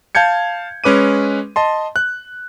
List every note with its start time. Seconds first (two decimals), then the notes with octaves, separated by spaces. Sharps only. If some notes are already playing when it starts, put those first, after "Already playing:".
0.15 F5 A5 G6 G#6 C#7
0.84 G#3 C#4 B4 D6 D#7
1.56 D#5 A5 C6
1.96 F#6